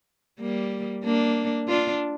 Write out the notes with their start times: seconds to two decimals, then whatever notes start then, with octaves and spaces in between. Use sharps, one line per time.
0.40 G3 A#3
1.05 A#3 D4
1.68 D4 F4